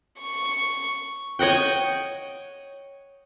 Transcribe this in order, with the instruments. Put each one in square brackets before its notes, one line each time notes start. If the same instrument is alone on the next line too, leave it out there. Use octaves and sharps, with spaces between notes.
[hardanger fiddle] C#6
[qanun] C#5 D#5 F#5 G5